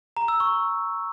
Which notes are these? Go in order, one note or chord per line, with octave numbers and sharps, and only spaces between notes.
A#5
E6
C#6